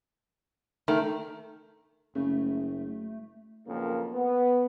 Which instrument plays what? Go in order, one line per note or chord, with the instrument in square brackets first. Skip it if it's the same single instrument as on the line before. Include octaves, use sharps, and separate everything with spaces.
[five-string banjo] D#3 [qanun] A3
[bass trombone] F#1 [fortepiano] C#3 [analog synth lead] A3
[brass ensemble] B1 F2 C#3 A#3
B3